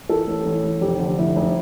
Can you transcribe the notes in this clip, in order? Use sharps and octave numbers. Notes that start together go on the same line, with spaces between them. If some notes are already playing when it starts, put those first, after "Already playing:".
E3 A4
A1
A1
A1
F1 G4
D3
F1 E4
F1